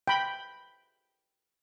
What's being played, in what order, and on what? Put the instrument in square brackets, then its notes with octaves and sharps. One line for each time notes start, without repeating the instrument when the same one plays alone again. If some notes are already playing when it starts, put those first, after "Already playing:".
[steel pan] G5 B5